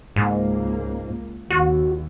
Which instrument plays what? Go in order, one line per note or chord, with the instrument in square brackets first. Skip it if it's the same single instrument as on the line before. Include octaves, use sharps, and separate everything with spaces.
[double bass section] C#2 A#3 [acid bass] G#2
[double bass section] D#2 [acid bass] F#4